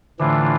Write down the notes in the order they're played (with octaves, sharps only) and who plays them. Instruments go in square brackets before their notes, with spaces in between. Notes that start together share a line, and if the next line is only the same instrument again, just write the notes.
[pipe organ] A2 E3 A3 D4 F4 [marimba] D3